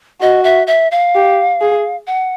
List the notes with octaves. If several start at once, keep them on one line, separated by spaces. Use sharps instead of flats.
F#4 D#5
E5
E5
F5
G4
G#4
F#5